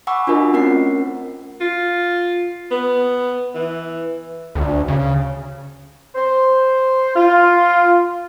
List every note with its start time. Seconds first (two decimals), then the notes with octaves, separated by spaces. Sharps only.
0.07 F#5 G#5 B5 C#6 D6 E6
0.27 D4 F4 F#4 A#4 D#5
0.53 A3 C4 C#4 A#4 F#5 C7
1.61 F4
2.71 B3
3.54 E3
4.55 D2
4.88 C#3
6.15 C5
7.15 F4